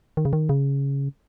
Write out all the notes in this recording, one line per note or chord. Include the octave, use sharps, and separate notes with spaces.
D#3
C#3
D#3
C#3